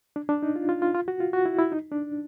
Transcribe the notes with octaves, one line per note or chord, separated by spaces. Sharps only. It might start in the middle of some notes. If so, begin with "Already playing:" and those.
D4
D4
D#4
F4
F4
F4
F4
F#4
F4
F#4
E4
E4
D#4
D4